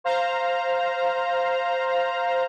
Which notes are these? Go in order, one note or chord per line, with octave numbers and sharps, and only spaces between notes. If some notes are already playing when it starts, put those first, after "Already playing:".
C5 F5 A#5